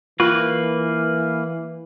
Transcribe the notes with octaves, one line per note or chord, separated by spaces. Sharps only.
E3 A#3 F4 B4